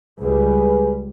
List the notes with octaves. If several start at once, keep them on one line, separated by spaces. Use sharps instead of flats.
C#2 G3 G#4 B4